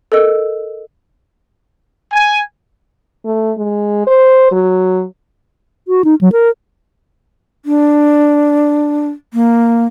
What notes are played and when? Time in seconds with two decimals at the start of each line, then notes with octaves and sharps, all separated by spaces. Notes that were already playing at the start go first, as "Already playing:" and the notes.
0.12 A4 A#4 D#5 E6
2.13 G#5
3.25 A3
3.57 G#3
4.07 C5
4.52 F#3
5.88 F#4
6.04 D#4
6.21 F#3
6.32 A#4
7.65 D4
9.34 A#3